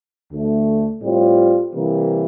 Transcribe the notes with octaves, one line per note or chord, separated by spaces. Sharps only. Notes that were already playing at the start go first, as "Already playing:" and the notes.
D2 D3 A3
A2 G3 C4 F4
C3 E3 G3 A#3 E4